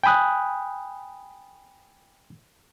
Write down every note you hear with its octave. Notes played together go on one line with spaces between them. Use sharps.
G5 G#5 B5 D#6 F#6